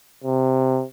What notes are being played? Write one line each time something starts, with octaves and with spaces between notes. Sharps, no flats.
C3